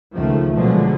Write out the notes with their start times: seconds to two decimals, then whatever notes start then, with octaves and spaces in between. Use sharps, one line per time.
0.13 C#2 D#3 F3 A3
0.53 B2 D3 F3 F#3 G#3